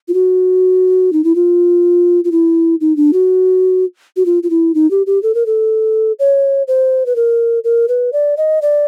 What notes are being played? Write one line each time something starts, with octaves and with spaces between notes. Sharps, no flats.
F4
F#4
D#4
E4
F4
F4
E4
D#4
D4
F#4
F#4
F4
F4
E4
D#4
G4
G4
A4
A#4
A4
C#5
C5
B4
A#4
A#4
B4
D5
D#5
D5